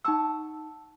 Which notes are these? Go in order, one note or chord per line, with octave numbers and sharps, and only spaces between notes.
D#4 F#5 A5 C#6 E6